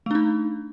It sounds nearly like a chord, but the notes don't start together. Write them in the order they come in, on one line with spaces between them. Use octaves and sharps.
A3 D4 D#4